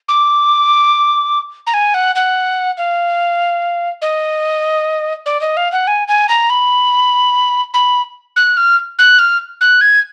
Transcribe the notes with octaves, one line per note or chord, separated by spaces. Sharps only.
D6
A#5
G#5
F#5
F#5
F5
D#5
D5
D#5
F5
F#5
G#5
G#5
A#5
B5
B5
F#6
F6
F#6
F6
F#6
G#6